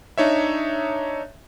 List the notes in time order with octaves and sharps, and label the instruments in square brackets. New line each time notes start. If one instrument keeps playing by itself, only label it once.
[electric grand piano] D4 D#4 C#5 E5